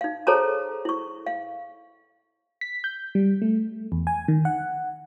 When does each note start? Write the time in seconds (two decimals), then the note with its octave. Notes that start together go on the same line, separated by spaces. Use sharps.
0.01 D#4 F5
0.27 G#4 A4 C5 C#5 A5 A#5
0.85 E4 C#6
1.27 F5
2.61 B6
2.84 G6
3.15 G3
3.42 A3
3.92 E2
4.07 G#5
4.28 D#3
4.45 F#5